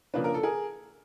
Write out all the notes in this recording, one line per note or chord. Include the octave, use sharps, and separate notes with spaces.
C#3 F3 A#3 D4 B4
A#4
A4
G#4 A#4